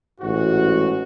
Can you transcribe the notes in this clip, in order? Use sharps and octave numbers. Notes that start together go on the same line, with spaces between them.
A1 G#2 F#4